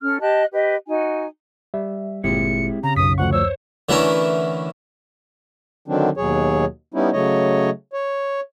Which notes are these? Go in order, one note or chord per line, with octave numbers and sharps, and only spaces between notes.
C#4 A4 F6
G4 D#5 A5 F#6
G4 B4 D#5
D#4 F#4 G#5
G3 E5
G1 A#2 G#3 C4 E4 G4 C#7
C#3 A#5
B1 F#2 D#6 B6
D2 F3 F#5 C#6
C5 C#5 E6
D3 E3 A3 C#4 A#4
D3 D#3 F#3 C4 D4
D#2 B2 F#3 G#4 C#5
G3 B3 C#4 D#4 E4
C#3 F#3 A3 C#5 D#5
C#5